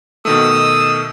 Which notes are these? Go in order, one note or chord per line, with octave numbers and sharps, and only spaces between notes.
B2 D#3 A3 D#6 E6